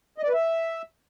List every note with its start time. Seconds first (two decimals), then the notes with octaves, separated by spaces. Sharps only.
0.18 D#5
0.23 D5
0.29 B4
0.34 E5